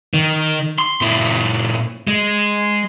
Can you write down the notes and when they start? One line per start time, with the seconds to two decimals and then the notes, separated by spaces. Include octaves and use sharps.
0.14 D#3
0.78 C6
1.01 A#2 E4
2.07 G#3